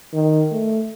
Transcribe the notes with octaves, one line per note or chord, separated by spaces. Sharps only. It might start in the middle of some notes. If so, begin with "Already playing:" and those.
D#3
A3